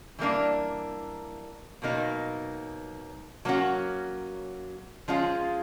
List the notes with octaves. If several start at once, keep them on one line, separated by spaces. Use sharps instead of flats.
E3 G3 A#3 D4
B2 F#3 A#3 D#4
F#3 A#3 C#4 F#4
F3 G#3 C#4 F4